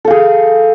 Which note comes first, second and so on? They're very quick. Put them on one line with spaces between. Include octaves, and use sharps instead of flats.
A4 F5 G#4